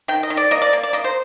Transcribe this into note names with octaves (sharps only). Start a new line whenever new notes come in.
D#3 G5
D#5
D#3
D5
A#3 D#5
D5
A#3
D5
A#3 D#5
C5